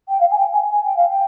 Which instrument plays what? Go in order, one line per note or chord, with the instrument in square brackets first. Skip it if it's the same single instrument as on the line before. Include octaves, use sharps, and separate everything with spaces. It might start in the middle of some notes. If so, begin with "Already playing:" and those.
[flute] G5
F5
G#5
G5
G#5
G#5
G5
F5
G5